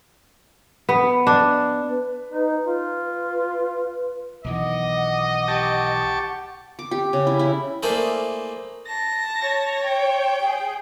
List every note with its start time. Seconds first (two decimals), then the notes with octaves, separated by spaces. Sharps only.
0.89 B3
1.27 D4
1.90 B4
2.32 D#4
2.66 F4 B4
4.44 B1 D#3 E3 D#5 F#5 D6
5.48 G4 A5 C#6
6.79 D6
6.91 G4
7.13 C#3
7.27 E4
7.39 E4
7.83 A3 A#3 E4 G#4 C5 D5
8.88 A5 A#6
9.41 C#5
9.84 G5
10.42 G#4